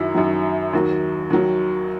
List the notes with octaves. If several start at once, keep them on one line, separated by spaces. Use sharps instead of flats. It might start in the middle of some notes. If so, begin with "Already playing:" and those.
Already playing: F#2 D#3 F#3 E4
F#2 D#3 F#3
D#2 D#3 F#3
D#2 D#3 F#3